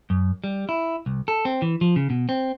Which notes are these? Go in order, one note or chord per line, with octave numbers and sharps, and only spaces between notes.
F#2
G3
E4
C2
A4
C4
E3
F3
C#3
B2
C4